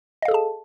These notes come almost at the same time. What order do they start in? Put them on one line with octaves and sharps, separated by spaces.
D#5 F5 A4 G#4 A5